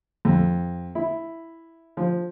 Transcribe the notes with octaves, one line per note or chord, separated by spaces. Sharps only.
F2
E4
F3